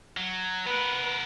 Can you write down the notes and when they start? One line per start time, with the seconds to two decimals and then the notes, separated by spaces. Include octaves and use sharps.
0.17 F#3
0.67 B3 A#4 B4